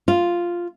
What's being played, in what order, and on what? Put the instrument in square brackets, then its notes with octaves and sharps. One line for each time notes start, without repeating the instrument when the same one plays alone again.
[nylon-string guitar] F4